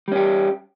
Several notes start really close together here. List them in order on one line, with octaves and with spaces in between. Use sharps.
G3 C#4 G4